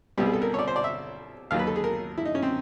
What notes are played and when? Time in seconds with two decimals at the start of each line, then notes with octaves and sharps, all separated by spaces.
0.17 C2 B2 G3 G4
0.26 G#4
0.33 A4
0.42 A#4
0.54 C#5
0.59 D5
0.68 C5
0.76 D5
0.84 E5
1.51 D#2 D#3 F#3 F5
1.59 B4
1.67 A4
1.76 G#4
1.84 A#4
2.18 E4
2.25 D#4
2.35 C#4
2.42 C4